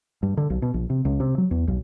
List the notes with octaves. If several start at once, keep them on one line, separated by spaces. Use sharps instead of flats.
G2
D3
B1
B2
A#1
C3
C#2
C3
F#3
E2
B1